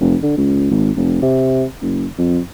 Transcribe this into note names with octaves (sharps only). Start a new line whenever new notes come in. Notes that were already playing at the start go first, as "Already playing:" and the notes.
F1
D3
C#2
G#1
F1
C3
F#1
F2